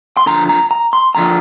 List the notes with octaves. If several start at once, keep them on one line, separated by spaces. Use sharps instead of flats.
C6
F2 D3 F3 A#5
A#5
A#5
C6
F2 D3 F3 A#5